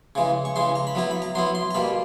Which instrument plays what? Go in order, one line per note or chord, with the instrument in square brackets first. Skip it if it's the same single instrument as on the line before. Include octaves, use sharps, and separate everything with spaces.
[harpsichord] C#3 E3 G#3
C#6
C#3 E3 G#3 C6
A#5
B5
F#3 B3 E4 A#5
B5
A#5
F#3 B3 E4 C6
C6
A#5
B2 G3 A#3 B5